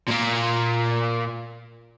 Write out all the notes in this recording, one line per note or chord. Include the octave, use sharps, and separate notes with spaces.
A#2 A#3